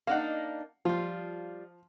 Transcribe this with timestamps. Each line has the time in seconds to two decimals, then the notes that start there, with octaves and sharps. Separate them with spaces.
0.07 A#3 D4 D#4 F5 F#5
0.85 F3 G3 F4